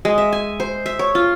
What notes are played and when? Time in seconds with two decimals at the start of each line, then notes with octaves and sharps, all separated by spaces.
0.05 G#3
0.18 E5
0.32 G#5
0.60 C5
0.86 E5
0.99 C#5
1.15 F4